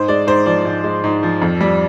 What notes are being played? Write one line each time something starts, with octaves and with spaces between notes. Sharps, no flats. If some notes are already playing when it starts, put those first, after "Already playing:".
Already playing: G#2 C5
G#3 D5
G#2 C5
F3 D5
G#2
G#3
G#2
F3
F2
G3